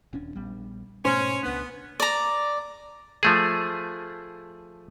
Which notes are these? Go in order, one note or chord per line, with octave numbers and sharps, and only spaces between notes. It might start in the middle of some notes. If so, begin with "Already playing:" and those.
D#1 C#4 D4
A#1 G3 B3
G#2 B2 A3 C#4 C5
C#2 B3 D4
D5 A#5
F3 A3 G#4